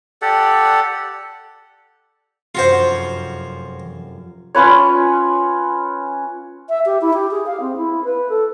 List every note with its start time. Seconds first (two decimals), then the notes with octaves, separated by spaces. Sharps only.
0.22 G4 A4 D5 F#5
2.55 F1 F#2 F4 F#4 C5
4.55 C#4 F4 B4 C#5
6.69 E5
6.86 G4
7.01 E4
7.13 G4
7.31 G#4
7.46 F5
7.61 C4
7.77 E4
8.04 B4
8.29 A4